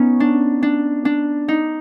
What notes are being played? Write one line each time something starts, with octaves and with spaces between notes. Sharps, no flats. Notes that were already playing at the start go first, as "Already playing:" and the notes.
Already playing: B3 C#4 D#4
D4
D4
D4
D#4